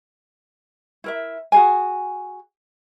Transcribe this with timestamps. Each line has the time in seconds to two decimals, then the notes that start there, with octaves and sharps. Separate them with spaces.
1.04 E4 A#4 E5
1.52 F#4 G#4 G#5